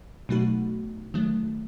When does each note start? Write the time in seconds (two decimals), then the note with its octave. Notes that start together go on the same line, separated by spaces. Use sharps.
0.29 B2 F#3 A3 D#4 F#4
1.14 D#3 F#3 A3